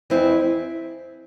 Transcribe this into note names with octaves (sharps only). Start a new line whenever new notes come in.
F2 E3 C4 E4